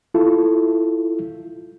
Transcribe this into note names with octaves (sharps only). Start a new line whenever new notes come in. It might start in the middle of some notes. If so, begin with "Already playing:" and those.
E4 F4 A4